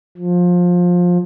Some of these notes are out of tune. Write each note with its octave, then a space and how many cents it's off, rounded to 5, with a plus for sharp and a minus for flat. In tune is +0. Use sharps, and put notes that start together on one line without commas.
F3 +20